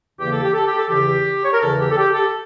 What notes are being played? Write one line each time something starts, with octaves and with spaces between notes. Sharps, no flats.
E2 C#3 E3 A#3 G4
A4
G4
A4
G4
A4
E2 C#3 E3 G4
C#5
A#4
E2 C#3 E3 A4
G4
A4
G4
A4